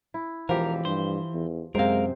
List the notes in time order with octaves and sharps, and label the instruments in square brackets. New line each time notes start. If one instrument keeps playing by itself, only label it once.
[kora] E4
[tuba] E1 [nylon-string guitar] E3 [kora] F3 G4 [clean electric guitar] A#4
[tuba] G2 [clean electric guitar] C5
[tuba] E2
[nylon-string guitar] F#2 C4 [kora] C3 C5 [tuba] G#3 [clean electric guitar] A#4 F5